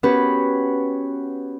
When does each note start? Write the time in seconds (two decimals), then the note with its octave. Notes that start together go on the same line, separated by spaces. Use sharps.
0.03 B3 C#4 F#4 G4 B4